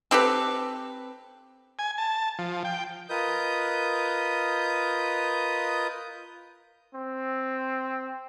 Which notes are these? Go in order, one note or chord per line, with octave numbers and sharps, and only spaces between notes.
C4 G4 A4 B4
G#5
A5
F3
G5
F4 A#4 B4 D#5 D#6 G6
C4